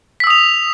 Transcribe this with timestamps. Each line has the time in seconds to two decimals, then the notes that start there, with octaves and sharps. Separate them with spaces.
0.20 B6
0.24 E6
0.27 D#6
0.30 F7